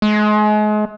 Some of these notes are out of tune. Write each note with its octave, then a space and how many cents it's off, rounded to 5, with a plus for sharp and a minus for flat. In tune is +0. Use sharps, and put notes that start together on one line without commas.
G#3 +35